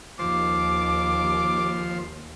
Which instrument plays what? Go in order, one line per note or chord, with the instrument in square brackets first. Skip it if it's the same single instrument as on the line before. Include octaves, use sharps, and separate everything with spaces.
[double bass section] D#2 [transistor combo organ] F3 C5 [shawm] D6